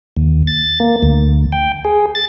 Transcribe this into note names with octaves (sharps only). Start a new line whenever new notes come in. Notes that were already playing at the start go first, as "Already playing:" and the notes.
D#2
A6
A#3
D2
G5
G#4
A6